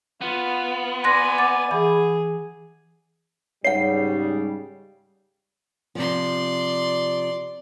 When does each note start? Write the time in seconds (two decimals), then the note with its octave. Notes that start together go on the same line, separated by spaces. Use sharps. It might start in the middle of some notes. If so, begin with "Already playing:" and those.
0.21 B3 F4
1.04 D5 G#5 C6 F#6 A#6
1.38 F#5 D6 A6
1.71 E3 G#4 F#5 B5
3.64 G#2 C#3 G3 C#5 F#5 C7
5.95 C3 F3 D5 C6